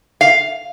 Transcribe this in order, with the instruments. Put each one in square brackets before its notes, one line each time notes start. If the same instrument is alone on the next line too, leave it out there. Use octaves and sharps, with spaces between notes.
[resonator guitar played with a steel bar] F5